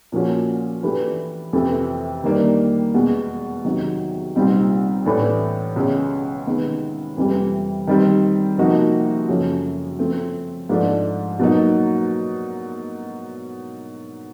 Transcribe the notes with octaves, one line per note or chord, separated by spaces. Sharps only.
A#2 F3 A#3 C#4 F#4
E3 A3 D4 G4 B4
F2 C3 E3 A3
D#3 G3 A#3 D4
E2 B2 G#3
E2 C3 D#3 F#3
C2 A#2 G3 C4 D#4
A2 E3 A3 D4
C#2 B2 G#3 C#4
C3 D#3 G#3 B3
F2 C3 E3 G3
D#3 G3 C4
C3 F3 A#3 D#4 F#4
F#2 C#3 F3 A3 C#4
F3 A3 C4
G#2 F3 A3 D4
B2 F#3 A#3 D#4